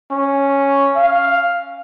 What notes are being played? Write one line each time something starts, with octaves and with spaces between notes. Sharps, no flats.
C#4
F5